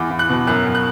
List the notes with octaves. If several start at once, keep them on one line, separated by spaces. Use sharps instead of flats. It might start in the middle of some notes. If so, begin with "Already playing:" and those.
Already playing: E2 E3 D6
E2
F#6
B2
F#2 F#6
F#2
F#6